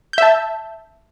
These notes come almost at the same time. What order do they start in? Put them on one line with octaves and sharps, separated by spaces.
G6 E5 A5